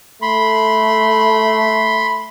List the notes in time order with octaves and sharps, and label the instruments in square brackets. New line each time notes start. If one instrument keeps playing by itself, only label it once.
[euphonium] A3 [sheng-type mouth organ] B5 C6